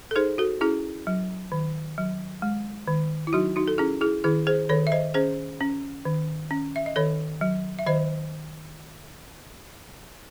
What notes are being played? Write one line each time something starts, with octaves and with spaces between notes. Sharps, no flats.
A4
D#4 G#4 C5
F#4 A4
C#4 E4 G#4
F#3
D#3
F#3
G#3
D#3
E4
F#3 D#4 F#4
D#4 F#4
A4
C#4 E4 G#4
E4 G#4
D#3 E4 G#4
G#4 C5
D#3 A4 C#5
E5
C5 D#5
C#4 G#4 C5
C#4
D#3
C#4
E5
D#5
D#3 A4 C#5
F#3
E5
D#3 C5 D#5